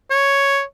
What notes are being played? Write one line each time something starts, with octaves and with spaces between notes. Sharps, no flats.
C#5